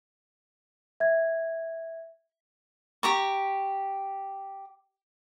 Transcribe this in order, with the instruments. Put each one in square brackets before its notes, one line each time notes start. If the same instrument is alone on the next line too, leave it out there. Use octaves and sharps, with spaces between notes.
[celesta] E5 G#6
[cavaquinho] G4 A#5 C#6